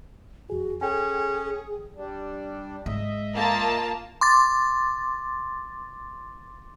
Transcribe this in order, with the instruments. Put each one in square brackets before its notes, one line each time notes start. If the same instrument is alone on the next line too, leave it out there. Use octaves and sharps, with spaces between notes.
[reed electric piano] F2 G#4 [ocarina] F#4
[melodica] C#4 [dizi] G#4 [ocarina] A4 [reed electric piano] G5 G#5
[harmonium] G3 D4
[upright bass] G#2 G#3 [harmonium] D#5 E5
[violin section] A#3 F4 A5
[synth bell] C6 D6 A6